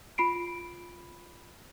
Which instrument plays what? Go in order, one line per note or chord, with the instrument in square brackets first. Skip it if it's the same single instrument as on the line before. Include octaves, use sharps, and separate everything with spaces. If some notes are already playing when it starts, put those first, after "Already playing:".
[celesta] F4 B5 C7 D7